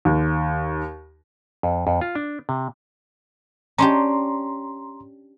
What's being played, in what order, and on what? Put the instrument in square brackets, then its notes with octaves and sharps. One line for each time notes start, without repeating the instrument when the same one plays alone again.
[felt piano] D#2
[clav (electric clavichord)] F2
F2
F4
D4
C3
[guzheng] C#4 D4 G4 [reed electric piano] A#5 C6